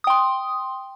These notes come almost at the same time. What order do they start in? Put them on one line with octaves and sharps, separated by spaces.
D#6 G5 C6